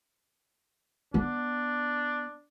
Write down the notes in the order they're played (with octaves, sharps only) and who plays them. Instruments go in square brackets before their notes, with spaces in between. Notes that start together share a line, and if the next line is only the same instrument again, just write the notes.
[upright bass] B3 [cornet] D4